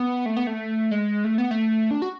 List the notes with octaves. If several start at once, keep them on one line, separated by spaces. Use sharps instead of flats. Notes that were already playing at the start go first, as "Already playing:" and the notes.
Already playing: B3
A3
B3
A3
G#3
A3
B3
A3
D4
F#4